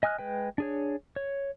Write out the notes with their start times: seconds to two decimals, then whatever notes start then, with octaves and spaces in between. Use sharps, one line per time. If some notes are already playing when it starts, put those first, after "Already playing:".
0.03 D#5 G#5 D#6 F6 F#6
0.18 G#3 B4 G5
0.58 D4 G#4 C#5
1.16 C#5